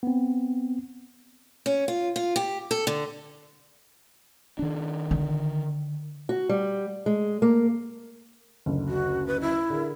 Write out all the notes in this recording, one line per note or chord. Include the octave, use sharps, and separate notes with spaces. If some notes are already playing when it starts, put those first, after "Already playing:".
B3 C4
C#4
F4
F4
G4
A4
D3
D#3 D4
D3
F#4
G3
G#3
A#3
F#1 D2
F#4
B4
E4
D3 G#4 A#4